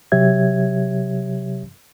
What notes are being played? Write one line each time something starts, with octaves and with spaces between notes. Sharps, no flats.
C3 F#3 G4 C#5 E5 G#6